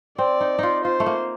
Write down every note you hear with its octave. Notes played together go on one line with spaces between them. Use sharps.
C4 D5
D#4
D#4 F4
F4 C5
A3
A#3